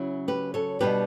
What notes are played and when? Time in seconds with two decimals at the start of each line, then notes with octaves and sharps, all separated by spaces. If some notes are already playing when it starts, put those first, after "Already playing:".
Already playing: C#3 F#3 C#4 E4
0.28 G4 B4
0.54 A4 C#5
0.80 B2 G3 B3 D4 G4 B4